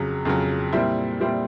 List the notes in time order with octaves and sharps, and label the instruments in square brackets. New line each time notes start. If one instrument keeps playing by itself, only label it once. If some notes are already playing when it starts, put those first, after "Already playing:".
Already playing: [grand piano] F2 C#3 F#3
F2 C#3 F#3
A#2 G3 C4 E4
A#2 G3 C4 E4